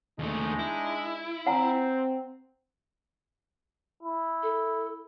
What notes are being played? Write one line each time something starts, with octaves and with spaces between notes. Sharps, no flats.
D#2 G#3 A3 D4 D#4
E4
C4 F#5 G#5 A#5
E4
A4